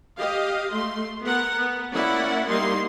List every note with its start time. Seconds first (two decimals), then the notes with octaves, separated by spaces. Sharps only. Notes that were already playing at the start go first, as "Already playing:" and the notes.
0.17 G4 D#5 F5
0.72 A3 C6
1.22 B3 A#4 F#5
1.57 B3
1.93 A#3 C#4 E4 D5 F#5
2.47 G3 A#3 D#4 C6